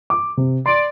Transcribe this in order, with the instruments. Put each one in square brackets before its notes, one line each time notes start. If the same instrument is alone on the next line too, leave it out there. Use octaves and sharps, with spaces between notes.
[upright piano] D6
C3
[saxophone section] D5 [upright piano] C6